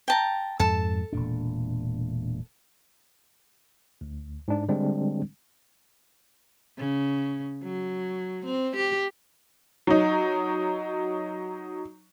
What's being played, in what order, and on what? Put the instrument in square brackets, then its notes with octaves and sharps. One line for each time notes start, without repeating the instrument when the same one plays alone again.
[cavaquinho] G5 A5 A#5
[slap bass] F2 G#2 [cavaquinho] A4 A5
[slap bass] E1 A#2 D4
[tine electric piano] D2
G#2 D4
D3 G3 G#3 C4 D4
[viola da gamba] C#3
F#3
C4
G4
[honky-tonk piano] F#3 D#4